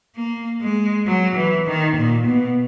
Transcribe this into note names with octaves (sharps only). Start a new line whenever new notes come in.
A#3
G#3
F#3
E3
D#3
A#2
B2